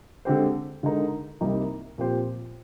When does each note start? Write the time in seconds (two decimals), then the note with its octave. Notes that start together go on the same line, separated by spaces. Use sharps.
0.25 D3 G#3 C4 G4 C5
0.83 D3 G#3 D#4 A#4
1.41 C2 C3 G3 A#3 D#4
1.98 A#2 F3 C4 G4 C5